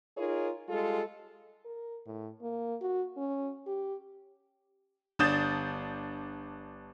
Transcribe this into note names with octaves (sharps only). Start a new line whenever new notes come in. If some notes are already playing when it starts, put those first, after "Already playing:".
D#4 F4 G#4 A#4 C#5
G3 G#3 F4 A4
A#4
A2
A#3
F#4
C#4
G4
G1 D4 D#6 G6 A6 E7